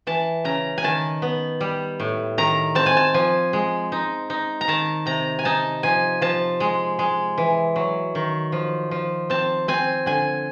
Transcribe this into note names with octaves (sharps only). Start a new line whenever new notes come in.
E3 A5
C#3 A#5
G#5
D#3 A5
B3
G3
A2
D#3 A#5
C4 A5
G#5
A5
F3 G#5
G#3
D#4
D#4
A#5
D#3 A5
C3 A#5
G#5
D#4 A5
F3 G#5
F3 A5
G#3
G#3
E3
F#3
D#3
F3
F3
C4 A5
C4 G#5
D3 G#5